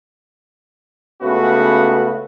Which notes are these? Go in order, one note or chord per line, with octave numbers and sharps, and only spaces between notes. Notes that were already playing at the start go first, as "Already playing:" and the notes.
C#2 C#3 A3 B3 F#4 B4